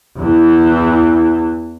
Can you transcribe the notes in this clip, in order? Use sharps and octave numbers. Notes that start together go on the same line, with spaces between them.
E2 E3